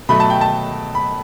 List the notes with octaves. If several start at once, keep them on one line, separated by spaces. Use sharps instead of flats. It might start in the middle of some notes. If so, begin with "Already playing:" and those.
B2 F#3 A3 B5
A5
G5
A5
B5